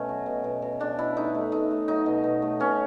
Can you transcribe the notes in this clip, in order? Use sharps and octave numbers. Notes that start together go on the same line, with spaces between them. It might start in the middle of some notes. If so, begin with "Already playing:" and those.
Already playing: B2 A3 C#4
F#3
B2
B2
B2
A3 D4
B2 E4
A3 D#4
A3
A3 D#4
A3
F#3 D#4
B2
B2
A3
B2 C#4